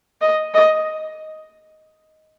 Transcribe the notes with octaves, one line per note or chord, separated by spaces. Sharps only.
D#5
D#5